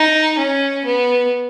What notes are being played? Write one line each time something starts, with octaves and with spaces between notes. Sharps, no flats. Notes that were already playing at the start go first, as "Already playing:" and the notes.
Already playing: D#4
C#4
B3